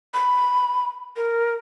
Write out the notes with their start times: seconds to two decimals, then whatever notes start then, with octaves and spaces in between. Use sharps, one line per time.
0.14 B5
1.16 A#4